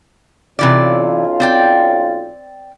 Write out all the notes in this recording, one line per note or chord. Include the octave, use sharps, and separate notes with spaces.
B1 C3 E3 C#4 F4 D5
C4 D5 G5